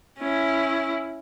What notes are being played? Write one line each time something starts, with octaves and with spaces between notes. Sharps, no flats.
C#4 E4